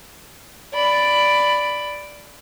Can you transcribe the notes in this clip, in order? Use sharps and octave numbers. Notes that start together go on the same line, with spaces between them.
D5 B5